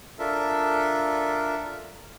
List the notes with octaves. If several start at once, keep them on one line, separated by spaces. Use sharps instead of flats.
D4 F4 A4 A#4 E5